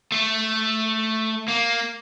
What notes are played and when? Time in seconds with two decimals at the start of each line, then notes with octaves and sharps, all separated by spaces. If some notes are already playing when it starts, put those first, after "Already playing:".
0.12 A3
1.48 A#3